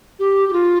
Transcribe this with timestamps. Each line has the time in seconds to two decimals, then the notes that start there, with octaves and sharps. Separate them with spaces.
0.19 G4
0.49 G4
0.53 F4